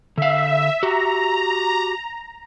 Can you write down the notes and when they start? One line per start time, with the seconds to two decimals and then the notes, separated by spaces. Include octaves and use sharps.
0.18 D3 E5 F5
0.83 F#4 G4 A#5